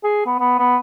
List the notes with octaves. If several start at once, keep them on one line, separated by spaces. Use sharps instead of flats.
G#4
B3
B3
B3